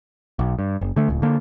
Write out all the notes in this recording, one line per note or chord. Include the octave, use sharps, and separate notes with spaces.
B1
G2
F#1
D3 A3
D1 C#2
D3 A#3